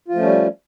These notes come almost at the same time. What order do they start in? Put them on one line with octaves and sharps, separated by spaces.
F4 F3 A3 C#4 G3